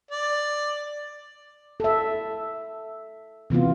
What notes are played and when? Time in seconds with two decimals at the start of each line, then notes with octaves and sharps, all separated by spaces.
0.11 D5
1.80 A4 E5
3.50 C3 E3 B3 F4